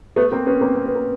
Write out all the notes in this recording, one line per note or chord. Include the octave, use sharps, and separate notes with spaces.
A3 B3
A#3 C4
B3 C#4
A#3 C4
C4
B3
A#3